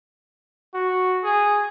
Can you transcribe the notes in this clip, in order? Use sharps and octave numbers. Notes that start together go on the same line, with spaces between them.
F#4
G#4